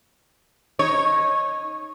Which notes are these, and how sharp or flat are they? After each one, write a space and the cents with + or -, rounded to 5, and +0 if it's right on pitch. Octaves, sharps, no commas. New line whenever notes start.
D#4 +0 C#5 -15